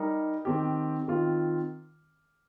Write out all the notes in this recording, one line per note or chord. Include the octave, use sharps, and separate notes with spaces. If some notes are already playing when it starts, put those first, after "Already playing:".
Already playing: G3 D#4 G4 A#4
D#3 C4 G4
D#3 C4 F4